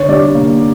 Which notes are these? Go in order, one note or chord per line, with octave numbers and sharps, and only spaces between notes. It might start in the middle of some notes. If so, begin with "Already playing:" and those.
Already playing: D3 C#5
G3 D5
A#3